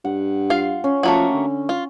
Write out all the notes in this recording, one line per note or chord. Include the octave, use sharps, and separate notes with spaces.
G2 F#5
F4 F5
C#4
F3 A3 A#3 F#4
D3
F4